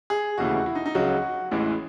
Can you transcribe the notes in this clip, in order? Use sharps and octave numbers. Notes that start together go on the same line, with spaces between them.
G#4
E1 D#2 C#3 E3 A3 F#4
E4
D#4
D#4
C#2 C#3 F#3 F#4
A1 A2 E3 G#3